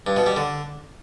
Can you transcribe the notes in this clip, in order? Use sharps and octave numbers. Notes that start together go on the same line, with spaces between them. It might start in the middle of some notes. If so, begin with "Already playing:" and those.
G2
B2
G3
D3